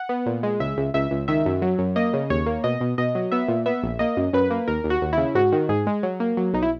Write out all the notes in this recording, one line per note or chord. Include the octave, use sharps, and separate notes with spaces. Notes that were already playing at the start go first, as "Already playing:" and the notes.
Already playing: F#5
B3
A#2
G#3
C#2 E5
C#2
C#2 E5
C#2
D#3 E5
F#2
F#3
F#2
A#3 D#5
C#3
D#2 C#5
A#3
B2 D#5
B2
B2 D#5
F#3
B3 E5
A#2
B3 E5
A#1
A#3 D#5
F#2
F#2 B4
A#3
D#2 A#4
D#2
F#4
D#2
E4
C#3
G#2 F#4
D#3
G#2 G#4
G#3
F#3
A#3
F#3
B1 D#4
E4